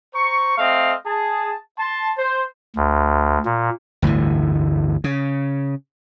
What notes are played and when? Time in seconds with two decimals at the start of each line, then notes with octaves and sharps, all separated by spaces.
0.14 C5 A#5 C#6
0.58 A3 C4 D#5 F5
1.06 G#4 A5
1.79 A5 C6
2.18 C5
2.76 D2
3.45 A#2
4.02 G1 D2 A2 E3
5.04 C#3